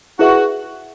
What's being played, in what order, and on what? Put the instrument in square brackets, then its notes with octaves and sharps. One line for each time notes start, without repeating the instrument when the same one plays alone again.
[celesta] E4 G#4 B4 E5 [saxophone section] F#4